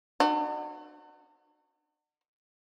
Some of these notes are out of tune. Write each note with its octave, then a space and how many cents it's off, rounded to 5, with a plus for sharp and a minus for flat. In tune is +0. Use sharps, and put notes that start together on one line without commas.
D4 +45 F#4 +0